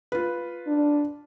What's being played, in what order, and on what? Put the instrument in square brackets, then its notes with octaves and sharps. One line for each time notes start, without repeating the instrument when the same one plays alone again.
[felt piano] F4 B4
[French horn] D4